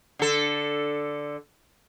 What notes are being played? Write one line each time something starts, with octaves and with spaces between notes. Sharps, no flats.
D3 A4